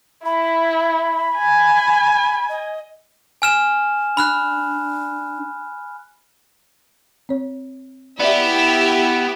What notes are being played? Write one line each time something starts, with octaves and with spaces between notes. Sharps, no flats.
E4 B5
G#5
D#5
G#5 F6 E7
D4 B5 F6 F#6
C4 C#5
B3 E4 G4 D5 E5